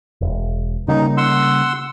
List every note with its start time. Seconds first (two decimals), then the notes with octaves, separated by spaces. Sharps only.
0.21 E1
0.88 C#3 G3 A#3 D#4
1.17 F#5 C6 E6